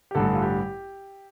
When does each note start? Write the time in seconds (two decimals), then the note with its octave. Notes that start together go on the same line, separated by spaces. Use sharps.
0.11 G4
0.15 A1 G2 D3 A4
0.35 F4
0.42 G4